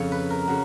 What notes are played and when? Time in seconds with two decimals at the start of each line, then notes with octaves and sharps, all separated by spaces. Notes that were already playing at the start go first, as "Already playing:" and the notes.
Already playing: F2 C#3 C#5
0.12 B4
0.30 A#4
0.47 C#3 F#4